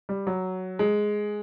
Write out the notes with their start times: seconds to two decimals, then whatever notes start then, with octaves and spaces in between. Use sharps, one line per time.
0.09 G3
0.27 F#3
0.79 G#3